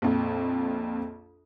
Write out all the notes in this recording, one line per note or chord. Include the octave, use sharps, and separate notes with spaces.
A#1 F2